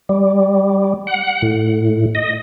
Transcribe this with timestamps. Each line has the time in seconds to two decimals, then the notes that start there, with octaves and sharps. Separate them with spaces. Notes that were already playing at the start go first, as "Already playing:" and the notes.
0.09 G3
1.07 F#5
1.42 A2
2.15 D#5